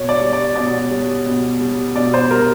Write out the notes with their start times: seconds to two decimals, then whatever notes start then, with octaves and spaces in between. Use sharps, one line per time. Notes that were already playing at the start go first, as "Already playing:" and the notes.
Already playing: B2 C#5
0.09 D5
0.21 G3
0.33 D5
0.55 B2 D5
0.91 G3
1.26 B2
1.61 G3
1.95 B2 D5
2.14 C5
2.30 G3 A#4